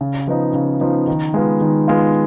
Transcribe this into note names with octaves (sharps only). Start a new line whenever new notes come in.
C#3
F3 B3 D#4
C#3
F3 B3 D#4
D#3
G#3 B3 F4
D#3
G#3 B3 F4